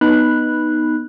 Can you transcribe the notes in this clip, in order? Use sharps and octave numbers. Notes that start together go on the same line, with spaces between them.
B3 D#4 B5 F#6